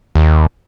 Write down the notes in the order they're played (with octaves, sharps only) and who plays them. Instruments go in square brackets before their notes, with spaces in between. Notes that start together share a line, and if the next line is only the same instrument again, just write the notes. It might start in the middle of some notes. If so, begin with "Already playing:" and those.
[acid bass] D#2